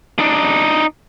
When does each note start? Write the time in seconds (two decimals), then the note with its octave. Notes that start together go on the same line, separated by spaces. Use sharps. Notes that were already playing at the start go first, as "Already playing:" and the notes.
0.19 D4 D#4